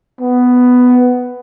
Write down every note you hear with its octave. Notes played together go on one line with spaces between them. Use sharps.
B3